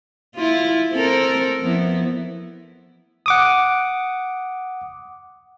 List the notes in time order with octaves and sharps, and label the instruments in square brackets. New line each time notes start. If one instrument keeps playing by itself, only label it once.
[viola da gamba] E4 F4
C4 A4 A#4
F2 B3 E4
[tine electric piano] F#5 D6 D#6